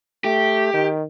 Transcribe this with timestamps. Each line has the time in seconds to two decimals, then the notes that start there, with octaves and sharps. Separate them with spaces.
0.24 A3 G4
0.74 D#3